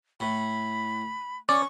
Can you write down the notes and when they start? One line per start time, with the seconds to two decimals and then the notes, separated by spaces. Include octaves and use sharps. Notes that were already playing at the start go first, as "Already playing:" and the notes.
0.20 A2 B5
1.49 C#4 D5 C#6